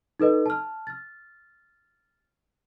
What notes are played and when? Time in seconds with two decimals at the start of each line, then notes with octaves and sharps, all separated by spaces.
0.20 D#4 A4 B4 D#5
0.46 A5 F6
0.87 F6 A6